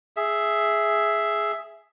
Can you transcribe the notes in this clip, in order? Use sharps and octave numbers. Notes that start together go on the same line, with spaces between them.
G#4 E5